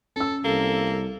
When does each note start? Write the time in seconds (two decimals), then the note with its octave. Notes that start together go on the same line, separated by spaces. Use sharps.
0.16 C#4 A4 E6
0.44 C2 A#3 A4